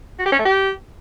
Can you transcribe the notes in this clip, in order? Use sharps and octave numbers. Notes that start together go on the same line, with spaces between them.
F#4
G4
C#4
A3
G4